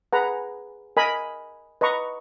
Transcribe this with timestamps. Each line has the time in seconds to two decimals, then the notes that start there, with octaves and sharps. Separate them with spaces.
0.13 G#4 B4 F#5 A#5
0.97 A#4 D#5 G#5 B5
1.81 B4 D#5 A#5 C#6